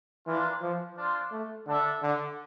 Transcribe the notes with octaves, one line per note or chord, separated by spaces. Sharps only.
E3 A#3 D4 F4
F3
D4 F4 C5
A3
D3 D4 A4 E5
D3